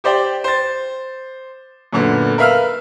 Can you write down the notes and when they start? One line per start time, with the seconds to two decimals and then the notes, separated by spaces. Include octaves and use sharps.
0.04 G4 C5 D5 G5
0.44 C5 A6
1.93 F#2 A#2 D3 B3
2.38 A#4 B4 E5 F5 E6 F6